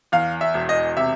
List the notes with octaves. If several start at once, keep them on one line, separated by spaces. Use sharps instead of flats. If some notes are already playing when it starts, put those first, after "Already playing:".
E2 F5
E5
E1
D#5
C3 E5